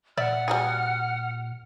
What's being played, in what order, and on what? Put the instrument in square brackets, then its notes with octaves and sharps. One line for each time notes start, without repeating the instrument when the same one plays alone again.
[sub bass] A#2 [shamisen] D5 E5 [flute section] F#5 F6
[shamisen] G3 F#4 G#4